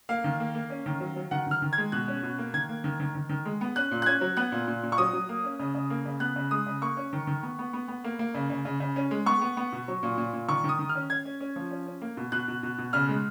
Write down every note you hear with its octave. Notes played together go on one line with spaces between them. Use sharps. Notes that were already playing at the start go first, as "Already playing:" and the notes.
A#3 F5
D#3
A#3
A#3
C#4
D#3
F#3
F#3
D#3 F#5
D#3 F6
D#3
G#6
G#3
B2 F#6
C#4
B2
A#3
D#3 G#6
A#3
D#3
D#3
D#3
D#3
G#3
B3
C#4 F#6
A#2
F#6
C#4 G#6
F#3
B3 F#6
A#2
A#2
A#2
C#6
F#3 D#6
F#3
A#3
C#4
C#3
C#3
A#3
C#3
B3 F#6
C#3
G#3 D#6
C#3
A#3 C#6
C#4
D#3
D#3
B3
B3
B3
B3
A#3
A#3
C#3
C#3
C#3
C#3
C#4
G#3
B3 C#6
B3
B3
B2
F#3
A#2
A#2
A#2
D#3 C#6
D#3 D#6
D#3
F6
C#4
C#4 G#6
C#4
C#4
F3
C#4
C#4
A#3
B2
B2 F#6
B2
B2
B2
C#3 F6
G#3